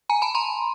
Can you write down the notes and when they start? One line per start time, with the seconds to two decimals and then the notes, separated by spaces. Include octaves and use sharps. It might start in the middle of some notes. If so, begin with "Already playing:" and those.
0.10 G#5 A#5
0.22 A5 B5
0.35 A#5 C6